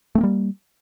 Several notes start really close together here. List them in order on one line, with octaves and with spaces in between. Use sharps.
A3 C4 A#3 G3